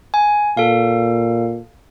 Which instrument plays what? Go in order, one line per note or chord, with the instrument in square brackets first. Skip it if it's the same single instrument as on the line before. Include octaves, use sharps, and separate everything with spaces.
[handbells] G#5
[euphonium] A#2 [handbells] A4 F5